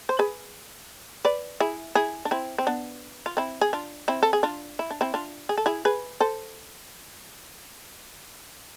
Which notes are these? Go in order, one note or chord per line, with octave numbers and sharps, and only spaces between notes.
C5
G#4 B4
B4 D5
E4 G#4
E4 G#4
D4
C4 E4
C4
B3 D4
F4
C4 E4
G#4
D4 F4
C4 E4
A4
G#4
D4 F4
E4
D4
C4 E4
D4 F4
G#4
A4
E4 G#4
G#4 B4
A4 C5